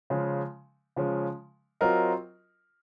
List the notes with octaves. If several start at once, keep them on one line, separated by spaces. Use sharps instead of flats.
C#3 F3 G#3 C#4
C#3 F3 G#3 C#4
F#3 C4 F4 A#4 D#5